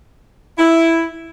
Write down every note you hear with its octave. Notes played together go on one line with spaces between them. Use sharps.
E4